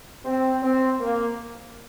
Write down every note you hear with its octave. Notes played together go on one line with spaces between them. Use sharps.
C4
C4
A#3